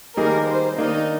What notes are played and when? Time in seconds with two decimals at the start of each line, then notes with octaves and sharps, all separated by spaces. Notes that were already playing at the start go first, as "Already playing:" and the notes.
0.16 D#3 G3 A#3 D#4 G#4 A#4
0.47 C5
0.77 D#3 A#3 D4 D#4